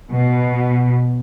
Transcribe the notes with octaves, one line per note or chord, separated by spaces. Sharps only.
B2